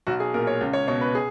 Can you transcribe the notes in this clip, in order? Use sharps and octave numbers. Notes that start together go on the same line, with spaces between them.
B1 F#4
G#4
A#2 A#4
C#5
C#2
C#5
B2 C#5
B4
G#4